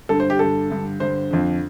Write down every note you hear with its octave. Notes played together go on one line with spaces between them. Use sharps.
G2 D3 A4
C5
G4
G2 D3 A4
G2 D3
G2 D3 C5
F2 D3